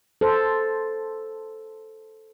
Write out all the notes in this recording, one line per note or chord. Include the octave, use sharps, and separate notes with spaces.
A4 C5